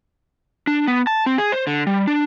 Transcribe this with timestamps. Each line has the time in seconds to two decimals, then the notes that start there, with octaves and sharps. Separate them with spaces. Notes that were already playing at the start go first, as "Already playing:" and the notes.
0.67 D4
0.87 B3
1.07 A5
1.26 C4
1.38 G#4
1.52 C5
1.67 D3
1.87 G3
2.07 D4